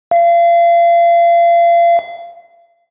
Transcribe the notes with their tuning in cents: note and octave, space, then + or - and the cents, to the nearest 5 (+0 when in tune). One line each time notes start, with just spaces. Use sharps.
F5 -35